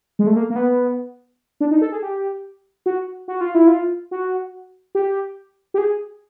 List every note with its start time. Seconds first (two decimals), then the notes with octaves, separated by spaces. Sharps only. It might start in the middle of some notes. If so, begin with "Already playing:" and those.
0.19 G#3
0.27 A3
0.36 A#3
0.50 A#3
0.56 B3
1.61 D4
1.71 D#4
1.81 A4
1.92 G#4
2.02 G4
2.86 F#4
3.28 F#4
3.41 F4
3.55 E4
3.67 F4
4.11 F#4
4.95 G4
5.74 G4
5.78 G#4